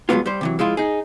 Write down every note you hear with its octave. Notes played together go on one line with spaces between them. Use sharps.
G2 F#3 G#3 A#3 B3 F4
G3 C5
C3 E3 F#3
F3 G#3 E4 F4
D#4 G#4